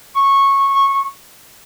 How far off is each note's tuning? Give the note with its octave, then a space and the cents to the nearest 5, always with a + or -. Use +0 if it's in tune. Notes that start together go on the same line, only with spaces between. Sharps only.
C#6 -15